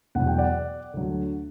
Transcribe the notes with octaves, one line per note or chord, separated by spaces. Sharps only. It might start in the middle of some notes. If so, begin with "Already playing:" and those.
E2 B2 F#3 F#5
G5
D5 F#5
D2 D3 F#3